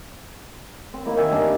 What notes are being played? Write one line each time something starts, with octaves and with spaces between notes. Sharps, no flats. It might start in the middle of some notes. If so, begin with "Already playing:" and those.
C4
A#3 D#4 E4
D#3 E5 G#5
G2 A#3 D4 D#4